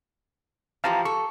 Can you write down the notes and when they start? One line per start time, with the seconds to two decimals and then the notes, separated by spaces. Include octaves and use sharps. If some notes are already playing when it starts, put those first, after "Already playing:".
0.84 E3 F3 G4 F5 A5 A#5
1.05 A4 C#6